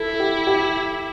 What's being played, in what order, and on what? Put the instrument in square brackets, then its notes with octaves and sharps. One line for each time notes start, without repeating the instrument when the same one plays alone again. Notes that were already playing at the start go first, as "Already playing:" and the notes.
Already playing: [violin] E4 [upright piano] A4
[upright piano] G4
G4